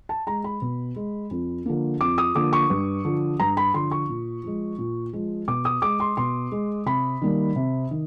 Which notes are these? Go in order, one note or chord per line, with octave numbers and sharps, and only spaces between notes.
A5
G#3 A#5
B5
B2
G#3
F2
D3 F3 A#3
F2 D6
D#6
D3 F3 A#3 D6
C#6
G2
D3 F3
G2 A#5
B5
D3 F3 C6
C#6
A#2
F3 G#3
A#2
F3 G#3
B2 D6
D#6
G#3 D6
C6
B2 C6
G#3
C3 B5
D#3 G3 A#3
C3
D#3